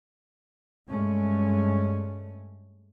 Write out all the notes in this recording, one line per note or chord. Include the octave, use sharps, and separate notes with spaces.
G2 G#3 A3 C#4